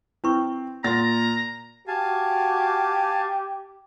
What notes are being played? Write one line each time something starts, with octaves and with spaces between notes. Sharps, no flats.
C4 E4 B4 C#6
A#2 F#5 A#5 C6 A6 A#6
F#4 G4 F5 G#5 A5